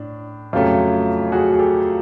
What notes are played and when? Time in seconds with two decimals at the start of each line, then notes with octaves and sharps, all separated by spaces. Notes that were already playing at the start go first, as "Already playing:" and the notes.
Already playing: A2 D4
0.53 F2 C#3 F#3 A3 F4 G4
1.32 F#4 G#4
1.53 G#4
1.59 G4 A4